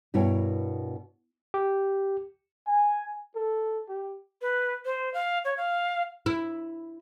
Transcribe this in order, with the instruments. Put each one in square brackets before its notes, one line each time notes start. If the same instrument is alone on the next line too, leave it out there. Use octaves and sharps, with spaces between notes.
[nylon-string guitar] G2 B2 E4 A#4 C#5 G5
[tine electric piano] G4
[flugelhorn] G#5
A4
G4
[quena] B4
C5
F5
C#5
F5
[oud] E4